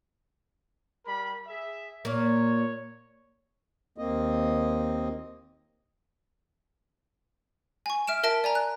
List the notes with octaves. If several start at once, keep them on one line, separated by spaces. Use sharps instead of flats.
G3 A#4 B5
G#4 E5
A#2 A#3 C#5
D#2 A#3 C4 D#5
G#5 C#6
E5 F6 D7 E7
A#4 E5 A5 A#6 D7
D5 G#5 A#5
F#6